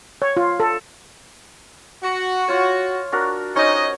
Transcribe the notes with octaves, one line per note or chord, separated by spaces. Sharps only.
C#5
F4
A4
F#4
F4 C#5
D4 F#4 A#4
C#4 D#4 C5 C#5 D#5